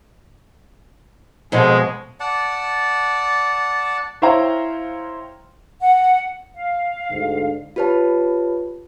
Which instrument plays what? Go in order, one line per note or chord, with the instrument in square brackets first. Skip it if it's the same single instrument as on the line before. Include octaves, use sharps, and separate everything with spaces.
[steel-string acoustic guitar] F2 B2 [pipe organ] G#3
[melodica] D5 F#5 A5
[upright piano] E4 C5 C#5 F5 G5 A#5
[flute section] F#5
F5
[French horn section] D2 G#2 D3
[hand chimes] F4 G4 B4 C#5 A5